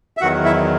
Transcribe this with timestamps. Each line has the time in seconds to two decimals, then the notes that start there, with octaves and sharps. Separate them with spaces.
0.17 E5
0.21 E2 D#3 F#3 F#4 F#5
0.45 E4 E5